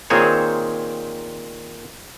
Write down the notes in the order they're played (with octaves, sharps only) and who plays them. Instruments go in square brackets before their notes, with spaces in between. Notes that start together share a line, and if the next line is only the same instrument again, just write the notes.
[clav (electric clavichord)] A#2 D#3 C4 G#4 C5 C#5